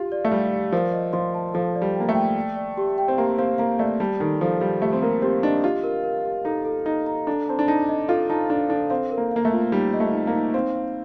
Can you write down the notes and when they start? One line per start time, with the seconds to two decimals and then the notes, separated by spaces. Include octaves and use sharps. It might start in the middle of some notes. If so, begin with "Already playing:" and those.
Already playing: F4 G4
0.12 D5
0.25 A3
0.32 G3 D5
0.52 D5
0.72 F3 A#4
0.93 D#5
1.13 F3 C6
1.34 A5
1.54 F3 A4
1.75 D5
1.82 G3
1.95 A#3 G5
2.09 A3
2.15 G5
2.37 D5
2.56 D5
2.77 G4
2.98 G5
3.08 C4
3.18 A#3 G4
3.38 C4 F5
3.58 A#3 F5
3.79 A3 D5
4.00 G3 A5
4.20 D#3 A4
4.41 F3 A4
4.61 G3 F5
4.82 A3 G4
4.93 C4
5.02 A#3 A#4
5.22 C4 G4
5.43 D4 D#5
5.64 F4 G4
5.84 A#4
6.04 A#4
6.25 G4
6.45 D#4 A4
6.65 A4
6.86 D#4 D#5
7.06 A#5
7.27 D4 A4
7.48 C4 A5
7.59 D4
7.68 D#4 A5
7.89 D#5
8.08 F4 A4
8.30 D#4 A5
8.50 D4 A4
8.69 D4 A4
8.90 C4 F5
9.11 A#4
9.17 A#3
9.31 A#3 F5
9.45 A3
9.52 F4
9.72 G3 D#4
9.93 D#5
10.00 A3
10.13 D#4
10.27 A#3
10.34 D#4
10.54 C4 F5
10.75 F5